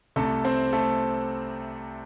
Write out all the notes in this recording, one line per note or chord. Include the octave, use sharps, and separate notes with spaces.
C2 C3 A3 A4
C4 C5
A3 A4